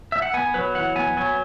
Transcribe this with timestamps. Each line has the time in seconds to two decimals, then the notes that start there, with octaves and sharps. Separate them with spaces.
0.12 E5
0.22 F#5
0.34 B3 G#5
0.54 F#3 B4
0.75 E3 F#5
0.96 B3 G#5
1.17 F#3 G#5